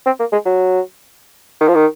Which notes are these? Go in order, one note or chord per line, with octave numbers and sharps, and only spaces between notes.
C4
A#3
G#3
F#3
D#3
F3
D#3